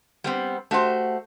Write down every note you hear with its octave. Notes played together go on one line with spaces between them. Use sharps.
G3 B3 C4
A3 F#4 G4 C5